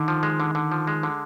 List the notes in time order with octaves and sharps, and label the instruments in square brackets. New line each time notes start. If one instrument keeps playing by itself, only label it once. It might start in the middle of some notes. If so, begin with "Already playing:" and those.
Already playing: [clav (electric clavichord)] D3 [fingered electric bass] D#3
[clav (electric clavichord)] F3
G#3
D3
D3
F3
G#3
D3